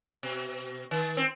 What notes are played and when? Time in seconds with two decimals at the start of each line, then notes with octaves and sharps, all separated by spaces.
0.23 B2
0.91 D#3
1.17 C4